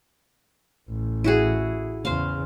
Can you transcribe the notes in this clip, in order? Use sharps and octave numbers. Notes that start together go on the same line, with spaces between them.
A1
E4 F#4 G#4
E2 C#3 C5 F5